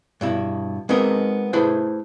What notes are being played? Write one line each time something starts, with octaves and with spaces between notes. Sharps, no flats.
G2 B2 E4
G#3 B3 C4 D#4 A#4 D#5
A3 E4 G#4 B4 C5